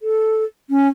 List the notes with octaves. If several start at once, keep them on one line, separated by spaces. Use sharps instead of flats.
A4
C#4